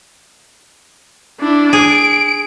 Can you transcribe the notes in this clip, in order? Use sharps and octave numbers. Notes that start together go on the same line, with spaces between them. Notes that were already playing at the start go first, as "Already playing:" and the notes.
D4 E4
G#4 D7